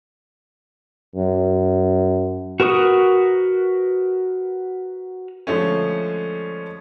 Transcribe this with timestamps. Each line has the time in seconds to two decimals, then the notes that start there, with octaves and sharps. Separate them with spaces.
1.16 F#2
2.60 F#4 A#4 B4 C#6 D#6
5.47 D3 F3 G#3 A3 C#4